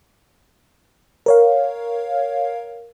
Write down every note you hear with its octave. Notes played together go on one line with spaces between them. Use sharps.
A#4 C#5 F5